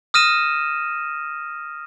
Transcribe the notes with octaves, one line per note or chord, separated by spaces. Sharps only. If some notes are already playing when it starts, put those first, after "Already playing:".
D#6 F6 A#6 D#7 E7